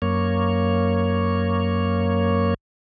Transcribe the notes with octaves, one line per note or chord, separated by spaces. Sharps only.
F#2 A#3 C#5